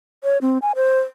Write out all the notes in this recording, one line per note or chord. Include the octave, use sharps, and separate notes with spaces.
C#5
C4
G#5
C5